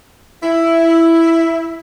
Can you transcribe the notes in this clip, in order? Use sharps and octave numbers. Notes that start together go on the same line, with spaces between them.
E4